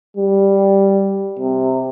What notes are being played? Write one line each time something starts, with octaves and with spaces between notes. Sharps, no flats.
G3
C3